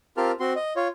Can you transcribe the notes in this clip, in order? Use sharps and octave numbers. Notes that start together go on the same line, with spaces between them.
C4 F4 G4 A#4 A5 F6
C4 F#4 C6
D#5
F4 C#5